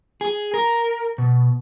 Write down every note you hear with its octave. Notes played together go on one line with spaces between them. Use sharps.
G#4
A#4
B2